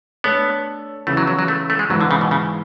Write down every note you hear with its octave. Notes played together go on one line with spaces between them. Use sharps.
A3 B3 D4 A4 C#5
C#3 E3 A3 B3 E4
F#3
F#3
F#3
A3
A3
G#3
G#2 E3 F#3 B3 E4
D3
C#3
B2
C#3